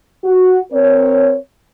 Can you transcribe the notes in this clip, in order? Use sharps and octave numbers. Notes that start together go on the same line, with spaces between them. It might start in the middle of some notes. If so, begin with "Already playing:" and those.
F#4
C4 A#4 C#5